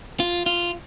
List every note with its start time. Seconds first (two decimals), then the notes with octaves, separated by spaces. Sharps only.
0.20 F4
0.46 F4